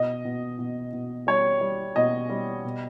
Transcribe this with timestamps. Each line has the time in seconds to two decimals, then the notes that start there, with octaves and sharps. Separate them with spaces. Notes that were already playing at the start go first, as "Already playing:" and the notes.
Already playing: B2 D#5
0.25 B2
0.59 B2
0.93 B2
1.27 G3 C#5
1.61 G3
1.96 B2 D#5
2.29 G3
2.65 B2